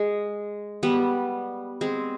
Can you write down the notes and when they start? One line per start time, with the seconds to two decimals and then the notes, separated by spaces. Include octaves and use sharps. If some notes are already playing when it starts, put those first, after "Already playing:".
Already playing: G#3
0.83 G3 B3
1.81 G#3 C4